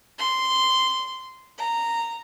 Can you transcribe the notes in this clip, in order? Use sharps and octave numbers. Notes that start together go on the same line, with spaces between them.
C6
A#5